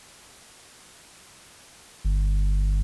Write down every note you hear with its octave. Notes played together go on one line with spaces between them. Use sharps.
G1